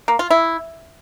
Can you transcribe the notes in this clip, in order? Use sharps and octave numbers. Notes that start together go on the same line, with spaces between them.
A#3
F4
E4